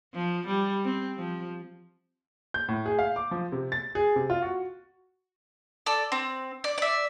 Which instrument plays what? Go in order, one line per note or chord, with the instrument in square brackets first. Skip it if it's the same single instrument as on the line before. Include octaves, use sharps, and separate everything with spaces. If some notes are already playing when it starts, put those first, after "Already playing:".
[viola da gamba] F3
G3
C4
F3
[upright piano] G6
A2
G#4
F5
D6
F3
C3
A6
G#4
C3
F4
F#4
[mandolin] A4 D5
C4
D5
D5 E5